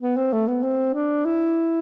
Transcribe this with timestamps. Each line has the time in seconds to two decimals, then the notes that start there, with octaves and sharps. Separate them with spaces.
0.01 B3
0.16 C4
0.32 A3
0.47 B3
0.63 C4
0.94 D4
1.25 E4